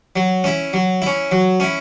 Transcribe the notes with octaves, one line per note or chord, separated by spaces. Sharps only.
F#3
C#4 E4
F#3
C#4 E4
F#3
C#4 E4